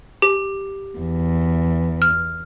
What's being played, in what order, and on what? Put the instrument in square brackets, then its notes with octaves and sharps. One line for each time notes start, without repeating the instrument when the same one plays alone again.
[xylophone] G4
[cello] E2
[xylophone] F6